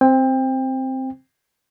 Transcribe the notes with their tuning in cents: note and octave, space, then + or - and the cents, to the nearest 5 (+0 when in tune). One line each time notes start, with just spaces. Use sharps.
C4 +0 G5 +25